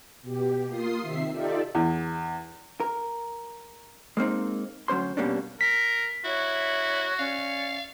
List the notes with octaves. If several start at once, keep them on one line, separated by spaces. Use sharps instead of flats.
B2 G4
A#3 F4 C6 D#6 C7
C3 D#3 E5 C7
D#4 F4 G4 A4 D5 E5
E2
A#4
G#3 A#3 C4 D#4
D2 F#3 C#4 C5 C6
G2 B2 G3 A#3 C#4 D4
A#4 B6
E4 F#4 C#5
C#4 D5 F5